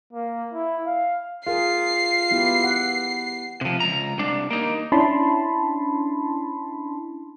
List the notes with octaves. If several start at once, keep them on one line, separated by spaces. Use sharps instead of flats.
A#3
E4
F5
F4 G#4 A#4 C7
B3 E4 G4
F#5
C3 F3
C#2 A#5
C2 D4
A#3 D#4
C#4 D4 E4 A5 B5 C6